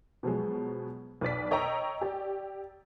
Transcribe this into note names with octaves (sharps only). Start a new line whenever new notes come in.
B2 F3 F#3 G#3
B1 B4 D5 B6
C#5 D#5 G5 A#5 C#6 E6
G4 D5